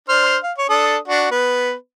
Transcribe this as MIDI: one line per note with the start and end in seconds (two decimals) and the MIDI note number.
0.09 0.37 62
0.09 0.37 72
0.09 0.37 89
0.43 0.52 77
0.58 0.67 73
0.69 0.97 62
0.69 0.97 69
0.69 0.97 87
1.08 1.27 62
1.08 1.27 66
1.31 1.73 59
1.31 1.73 71